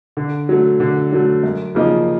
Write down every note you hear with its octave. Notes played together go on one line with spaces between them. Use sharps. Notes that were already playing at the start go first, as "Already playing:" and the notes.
D3
F#3 A3
D3
F#3 A3
F#2
C#3 F3 A#3 D#4